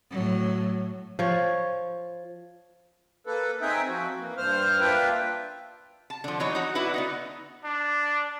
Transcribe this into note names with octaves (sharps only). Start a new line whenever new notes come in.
A2 F#3
F3 C#5
A#3 A4 B4
C4 D#4 G#4 E5 G5
F3 C4 F#4
E3 A#3
G2 C5 F6
A#3 D4 F4 B4 E5 G5
A5
D3 F3
E3 F#3 D#4 C#5
D#4 F#4
D4 E4 F#4 B4
D3 B3 D#4
D4